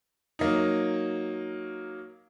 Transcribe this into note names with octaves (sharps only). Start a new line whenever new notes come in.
F#3 A#3 D#4